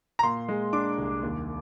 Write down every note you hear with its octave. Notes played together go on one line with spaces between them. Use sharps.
A#5
A#2 C6
G#3
D4 D6
C2
D#2